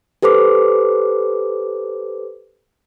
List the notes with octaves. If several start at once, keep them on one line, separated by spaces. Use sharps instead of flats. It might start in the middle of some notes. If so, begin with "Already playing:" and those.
G4 A4 B4 C5 D6